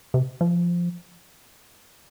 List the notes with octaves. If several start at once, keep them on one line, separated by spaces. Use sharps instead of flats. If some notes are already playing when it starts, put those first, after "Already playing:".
C3
F3